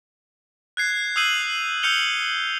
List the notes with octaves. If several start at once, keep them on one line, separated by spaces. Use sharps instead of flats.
F#6 G#6 C7
D#6 E6 G6 C7 D#7 F#7
E6 F6 G6 C#7 F7 G7